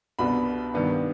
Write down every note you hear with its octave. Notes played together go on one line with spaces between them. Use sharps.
C2 B2 B3 D4 B5
G2 D#3 B3 D4